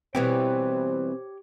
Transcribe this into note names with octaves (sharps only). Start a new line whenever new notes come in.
B2 E3 G3 C4 G4 C5 C#5 G5